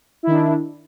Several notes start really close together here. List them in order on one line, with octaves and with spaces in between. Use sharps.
E4 D#3 D4